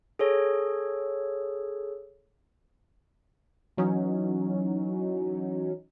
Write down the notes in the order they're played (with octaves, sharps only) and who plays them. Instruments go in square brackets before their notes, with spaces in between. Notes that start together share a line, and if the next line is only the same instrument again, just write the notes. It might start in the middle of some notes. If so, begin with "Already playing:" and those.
[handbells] G#4 A4 C#5
[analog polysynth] E3 F#3 C#4 D#4